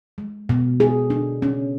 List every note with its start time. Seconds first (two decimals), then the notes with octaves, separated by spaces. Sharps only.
0.18 G#3
0.49 B2
0.80 G#4
1.10 D4
1.42 C#4